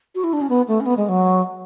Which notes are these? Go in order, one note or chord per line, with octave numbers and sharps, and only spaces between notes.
F#4
E4
D4
C#4
B3
A3
C#4
B3
G#3
F#3